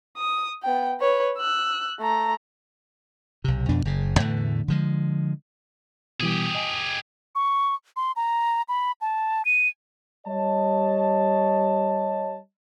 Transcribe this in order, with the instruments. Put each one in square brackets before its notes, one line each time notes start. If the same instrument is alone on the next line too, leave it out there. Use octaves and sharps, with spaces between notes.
[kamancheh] D#6
B3 G5
B4 C#5
E6 F#6
A3 A#5
[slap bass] B1 C3
F2 B2 D4
F#1 C#3
E2 A2 D3 A3
D3 F3 G#3
[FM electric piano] B2 E3 G3 [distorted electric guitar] G4 G#4
[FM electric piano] D#5 G#5
[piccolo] C#6
C6
A#5
B5
A5
D#7
[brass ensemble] G3 C#5 D#5 A5